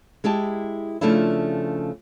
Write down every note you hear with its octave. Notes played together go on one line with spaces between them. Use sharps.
G#3 E4 G4 A5
C#3 F3 A3 D4 E4